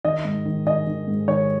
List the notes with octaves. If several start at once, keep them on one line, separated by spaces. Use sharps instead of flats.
D#3 D#5
G#2
D#3
D#3 D#5
D#3
G#2
D#3 C#5